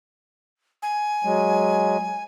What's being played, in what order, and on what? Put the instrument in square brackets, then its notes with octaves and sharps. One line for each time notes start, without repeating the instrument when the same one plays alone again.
[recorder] G#5
[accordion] F#3 G#3